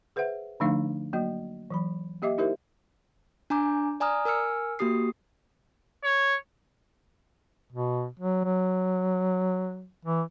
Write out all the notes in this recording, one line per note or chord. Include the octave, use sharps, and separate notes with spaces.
G#4 B4 C5 E5 F#5
D3 F3 A3 D4 D#4 F5
F#3 A#3 F#4 D#5
E3 F#3 B5
A#3 G4 D#5 E5 D6
D#4 E4 G4 A#4 C5 E5
D4 G#5 A#5 D6 G6
D5 G#5 A#5 D#6 F6
A#4 G#5 E6 F6 C#7
A#3 F#4 G4 D#6 C7
C#5
B2
F#3
F#3
E3